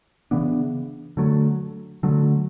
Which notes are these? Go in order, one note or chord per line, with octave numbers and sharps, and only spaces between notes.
C#3 E3 B3 D4
D3 F#3 A3
D3 F#3 A3